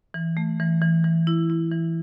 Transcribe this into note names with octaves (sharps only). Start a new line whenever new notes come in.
E3
A3
E3
E3
E3
E4
E4
E3